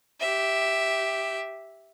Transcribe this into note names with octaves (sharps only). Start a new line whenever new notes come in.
G4 E5